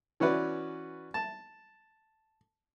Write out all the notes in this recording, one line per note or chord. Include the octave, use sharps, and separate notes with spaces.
E3 C#4 F#4 B4 D5
A5